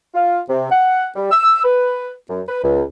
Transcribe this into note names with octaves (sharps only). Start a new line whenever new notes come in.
F4
C3
F#5
G3
E6
B4
F#2
B4
C#2